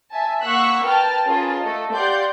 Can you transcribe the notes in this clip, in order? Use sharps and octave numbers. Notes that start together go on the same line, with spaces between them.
E5 G#5 A5
A#3 F#5 C#6 E6 F#6 B6
A#4 B4 G5 A5 F6 A6
C#4 F4 G#4 A#4 B4 A5
A3 A4 D#5
G4 D5 F5 F#5 C6 G6